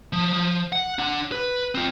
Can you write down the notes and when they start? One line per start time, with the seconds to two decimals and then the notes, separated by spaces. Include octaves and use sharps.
0.13 F3
0.33 F3
0.72 F#5
0.99 D4 F#5
1.32 B4
1.75 C4 F4